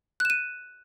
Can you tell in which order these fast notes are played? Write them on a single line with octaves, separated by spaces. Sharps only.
F#6 E7 D#7